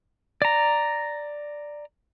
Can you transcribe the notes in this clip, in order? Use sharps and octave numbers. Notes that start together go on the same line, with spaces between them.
D5 A#5